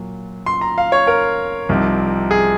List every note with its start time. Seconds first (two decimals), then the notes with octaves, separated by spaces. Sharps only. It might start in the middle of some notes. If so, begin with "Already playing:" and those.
Already playing: A#2 F#3
0.46 C6
0.61 A#5
0.78 F5
0.92 C#5
1.07 A#4
1.69 C2 C3 F3 C4 D#4
2.31 G#4